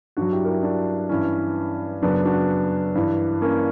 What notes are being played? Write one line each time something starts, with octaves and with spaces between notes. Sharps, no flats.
G2 F#3 D4 F#4
E4 G4
A#4
E4 G4
D4 F#4
G2 E3 C#4 E4
F#2 C#3 F#3 B3 D4
D4 F#4
G2 E3
A#3 C#4